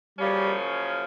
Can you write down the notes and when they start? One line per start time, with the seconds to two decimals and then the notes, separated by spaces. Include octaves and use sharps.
0.19 F#2 C#3 F3 G3 A#3 C#4